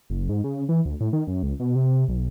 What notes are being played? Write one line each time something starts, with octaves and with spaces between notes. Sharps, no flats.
F#1
G#2
C#3
E3
D2
A2
D#3
F#2
C#2
B2
C3
B1